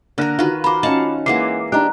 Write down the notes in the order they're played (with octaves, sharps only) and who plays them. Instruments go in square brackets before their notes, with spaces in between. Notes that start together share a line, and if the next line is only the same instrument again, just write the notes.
[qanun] D3 A#4 [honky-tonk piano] A#3 F#6 A#6
[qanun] D#3 B4 [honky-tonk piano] F4 F#4
[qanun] A#4 C5 [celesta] B5 D6
[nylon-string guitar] C#4 D#4 [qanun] F5 F#5 A5
[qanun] E3 G#3 A#3 [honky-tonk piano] F#5 D6 [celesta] C7
[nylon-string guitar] D4 G4 [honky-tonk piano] D#4 [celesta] A#5 F#6